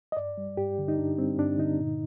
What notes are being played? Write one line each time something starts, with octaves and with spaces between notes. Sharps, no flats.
D#5
G2 D5
G3
G2 G4
D3
D#4
G2 D4
G3 C4
G2 D4
D3 D#4
A#2